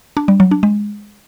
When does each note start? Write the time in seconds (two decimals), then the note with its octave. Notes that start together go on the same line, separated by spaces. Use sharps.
0.17 D4
0.28 G3
0.40 F#3
0.51 D4
0.63 G#3